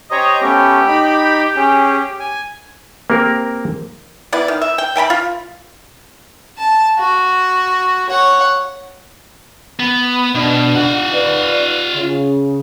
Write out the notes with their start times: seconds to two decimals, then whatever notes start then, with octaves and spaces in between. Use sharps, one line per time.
0.11 G4 C5 C#5 D#5 A#5
0.42 A3 B3 C#4 G4
0.87 D#4 B5
1.56 C#4 G#4
2.20 G#5
3.10 A#3 C4 G4 A#4
4.33 B3 E4 D5
4.48 D#3
4.62 E5
4.78 G5
4.96 E5 G5 A5 B5
5.10 F4
6.58 A5
6.98 F#4
8.10 C#5 F#5
9.79 B3
10.35 B2 D4
10.75 F4 F#5
11.13 B4 D5
11.95 C#3